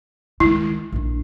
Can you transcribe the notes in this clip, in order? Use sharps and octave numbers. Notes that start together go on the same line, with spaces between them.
D#3 G#3 E4
A#1 D4